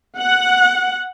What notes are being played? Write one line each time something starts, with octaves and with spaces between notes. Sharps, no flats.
F#5